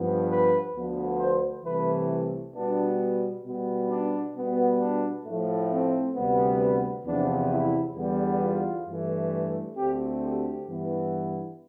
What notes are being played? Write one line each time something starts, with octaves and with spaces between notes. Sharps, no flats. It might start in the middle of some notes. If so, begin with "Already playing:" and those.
Already playing: G2 F3 B3
B4
D2 D3 F3 B3
C5
C2 C3 E3 A3 B4
B2 G3 B3 D4
B2 G3 B3
D4
B2 G3 B3
D4
A2 F3 A3
C4
D2 C3 G3 B3
E2 C3 F3 B3 D4
E4
E2 D3 G3 B3
F4
G2 E3 A3
D2 D3 A3 C4 G4
G4
G2 E3 B3